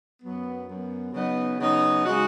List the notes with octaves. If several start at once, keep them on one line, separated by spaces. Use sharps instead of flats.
F#2 F#3 B3
F#2 F#3 B3
C#3 F#3 B3 D#4
C#3 F#3 B3 D#4
C#3 G#3 D#4 F#4